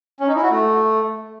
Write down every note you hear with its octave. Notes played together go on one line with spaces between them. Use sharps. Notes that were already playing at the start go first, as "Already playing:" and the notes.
C#4
D#4
E4
F#4
A3